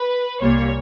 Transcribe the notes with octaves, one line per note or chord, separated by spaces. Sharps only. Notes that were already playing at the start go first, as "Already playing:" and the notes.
Already playing: B4
C2 A#2 G3 A#3 C#5